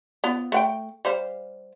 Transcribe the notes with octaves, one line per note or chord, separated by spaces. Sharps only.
B3 F4
A3 F#5 G5
G3 C5 F5